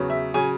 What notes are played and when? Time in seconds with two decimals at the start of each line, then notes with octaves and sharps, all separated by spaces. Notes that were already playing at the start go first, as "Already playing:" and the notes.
Already playing: E2 C#3 F#3
0.10 E5
0.34 C#3 F#3 G#5